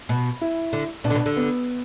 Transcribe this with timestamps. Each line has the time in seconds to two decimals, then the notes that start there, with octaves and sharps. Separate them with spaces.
0.09 B2
0.41 E4
0.73 D3
1.04 B2 D4
1.10 D3
1.15 B2
1.26 D3
1.37 B3